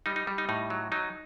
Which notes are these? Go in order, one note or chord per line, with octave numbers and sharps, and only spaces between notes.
G3 D#4
D#4
G3
D#4
A2 D#4
F#3
F#3 D#4